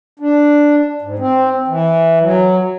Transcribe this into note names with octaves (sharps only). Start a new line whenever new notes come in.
D4
G#2
C4
E3
F#3